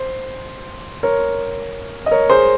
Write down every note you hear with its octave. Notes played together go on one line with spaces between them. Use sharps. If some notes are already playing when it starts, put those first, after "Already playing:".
Already playing: C5
A#4 C#5
D#5
A#4 C#5
G#4 C5